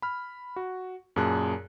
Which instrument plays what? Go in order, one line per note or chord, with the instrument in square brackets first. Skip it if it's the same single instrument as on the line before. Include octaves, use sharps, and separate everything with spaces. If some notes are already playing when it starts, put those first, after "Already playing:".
[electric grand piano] B5 F6
F#4
F#2 A#2 G#4 A5 F#6